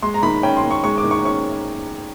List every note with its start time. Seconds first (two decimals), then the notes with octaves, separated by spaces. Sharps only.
0.02 G#3 C6
0.14 A#5
0.23 D#3 B5
0.43 C#4 G5
0.57 C6
0.64 D#3
0.71 C#6
0.84 G#3 C#6
0.98 D6
1.04 D#3
1.11 C#6
1.25 C#4 C#6